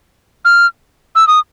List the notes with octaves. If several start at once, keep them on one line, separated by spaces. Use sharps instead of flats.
F6
E6
D#6